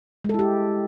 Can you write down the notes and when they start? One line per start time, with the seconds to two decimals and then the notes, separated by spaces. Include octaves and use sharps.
0.25 G#3
0.29 A4
0.34 E4
0.39 G4